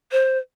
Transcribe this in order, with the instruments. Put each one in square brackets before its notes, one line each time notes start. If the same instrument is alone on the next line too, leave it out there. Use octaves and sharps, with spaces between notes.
[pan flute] C5